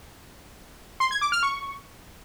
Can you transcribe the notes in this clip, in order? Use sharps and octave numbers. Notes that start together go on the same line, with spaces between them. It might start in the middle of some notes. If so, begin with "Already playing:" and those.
C6
G#6
D6
F6
C#6